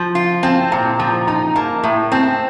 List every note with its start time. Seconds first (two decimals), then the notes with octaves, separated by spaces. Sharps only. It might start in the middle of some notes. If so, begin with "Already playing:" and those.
Already playing: F3
0.15 F4
0.43 C4 A5
0.72 A#2 A#5
0.99 F3 A#5
1.27 D#4 A#5
1.56 A#3 A5
1.83 A2
2.12 C4 A5